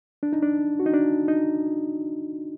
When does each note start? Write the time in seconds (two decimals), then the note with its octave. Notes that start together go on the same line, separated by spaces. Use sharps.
0.23 D4
0.33 D#4
0.42 D4
0.79 F#4
0.86 D#4
0.94 D4
1.28 D#4